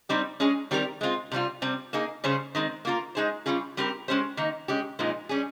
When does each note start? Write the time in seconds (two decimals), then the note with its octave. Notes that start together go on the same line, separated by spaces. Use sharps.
0.09 G3 C4 D#4 G4 C5
0.40 G#3 C#4 G#4
0.71 D#3 G3 C4 G4 A#4
1.01 G#3 C4 F4
1.32 C3 G3 C4 F4
1.62 C3 G3 C4
1.93 A#3 D#4 G#4
2.24 C#3 G3 C#4 G#4 C5
2.55 D#3 G#3 C4
2.85 A#3 F4 A#4
3.15 G#3 D#4 G#4 C5
3.46 G3 C#4 F4 G#4
3.77 G3 C4 G4 A#4
4.08 G#3 C#4 G4 C5
4.37 D#3 A#3 D#4
4.68 G#3 C#4 G4
4.99 A#2 F3 G#3 D#4
5.29 G3 C#4 G#4